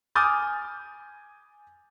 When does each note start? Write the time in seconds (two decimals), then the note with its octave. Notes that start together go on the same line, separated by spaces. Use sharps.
0.16 G#5 D6 D#6 F6 G6 A6